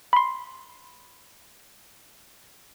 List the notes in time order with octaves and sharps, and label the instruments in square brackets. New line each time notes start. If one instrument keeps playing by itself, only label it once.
[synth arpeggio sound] B5 C6